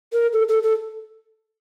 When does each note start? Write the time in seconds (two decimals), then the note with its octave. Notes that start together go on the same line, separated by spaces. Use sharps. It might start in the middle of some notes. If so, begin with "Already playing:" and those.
0.13 A#4
0.33 A4
0.49 A4
0.63 A4